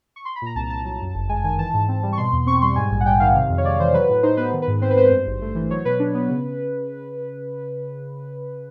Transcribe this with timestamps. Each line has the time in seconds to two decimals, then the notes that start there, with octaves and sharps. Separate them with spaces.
0.16 C#6
0.25 C6
0.36 B5
0.42 A#2 A#5
0.55 C2 A5
0.70 C2 A5
0.85 F#3
1.01 F#2
1.14 G1
1.29 G#3 G#5
1.44 D#3 G#5
1.59 E3 A5
1.73 G#2
1.88 C4
2.03 G3
2.13 C#6
2.17 B2 C6
2.32 E2
2.46 C4 C#6
2.62 G3 C6
2.76 G#2 G#5
2.90 A#1
3.01 F#5
3.06 G3 G5
3.20 D#3 F5
3.35 C3
3.50 F2
3.58 C#5
3.64 G#3 D5
3.80 E3 C5
3.94 F#3 B4
4.09 A2
4.23 D#4 C5
4.37 B3 B4
4.53 D#3
4.62 B4
4.67 G#2
4.82 C4 C5
4.91 B4
4.97 G#3 C5
5.11 G2
5.27 G#1
5.41 A3
5.55 E3
5.70 F#3 C#5
5.85 B2 B4
5.99 D4
6.14 B3
6.29 C#3